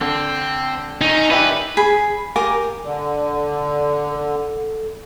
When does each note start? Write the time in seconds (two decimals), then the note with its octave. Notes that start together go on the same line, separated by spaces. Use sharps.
0.01 D3 C4
1.01 D#3 C#4 D#4
1.31 D4 E4 G4 B4
1.77 G#4 B5
2.36 G4 A#4 G#5 D6
2.85 D3 D5
4.09 A4